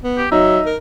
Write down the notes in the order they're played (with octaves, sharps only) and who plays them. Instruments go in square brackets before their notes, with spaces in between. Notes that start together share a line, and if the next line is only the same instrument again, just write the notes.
[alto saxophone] B3
[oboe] G4
[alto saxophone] F#3 [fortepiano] D#4 [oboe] E5
[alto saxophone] A#4